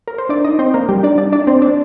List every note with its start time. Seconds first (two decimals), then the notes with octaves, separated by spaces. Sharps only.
0.08 A#4
0.18 C5
0.29 D4 D5
0.45 D#4 D#5
0.59 C4 C5
0.74 A#3 A#4
0.89 G3 G4
1.03 D4 D5
1.18 D4 D5
1.32 D4 D5
1.47 C4 C5
1.62 D4 D5